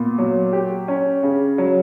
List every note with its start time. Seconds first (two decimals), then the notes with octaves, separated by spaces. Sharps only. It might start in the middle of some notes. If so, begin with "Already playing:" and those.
Already playing: A#2 B3
0.18 F#3
0.53 G4
0.88 C#4
1.23 C#3
1.58 F#3